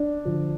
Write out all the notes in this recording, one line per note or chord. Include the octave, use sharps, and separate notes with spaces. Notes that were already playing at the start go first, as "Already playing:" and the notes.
Already playing: D4
D3 F3